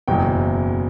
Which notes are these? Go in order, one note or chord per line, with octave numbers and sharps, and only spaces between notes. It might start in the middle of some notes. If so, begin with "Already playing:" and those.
F#1 E2 B2 F#3 G5